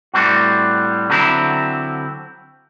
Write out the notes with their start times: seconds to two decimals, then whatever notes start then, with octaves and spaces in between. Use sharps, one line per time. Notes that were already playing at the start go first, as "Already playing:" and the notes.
0.14 A2 G3 C4 F#4
1.10 D3 F#3 C4 E4